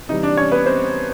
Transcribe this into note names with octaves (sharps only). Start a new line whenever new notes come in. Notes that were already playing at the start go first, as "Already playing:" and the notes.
C3 E3 G3 D#4 D#5
D4 D5
C#4 C#5
B3 B4
C4 C5